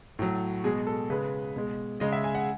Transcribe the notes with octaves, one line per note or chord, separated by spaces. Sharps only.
A2 F#3
B2 G#3 G#4
A4
C#3 G#3 B4
B2 G#3
C#3 G#3 D#5
E5
G#5
F#5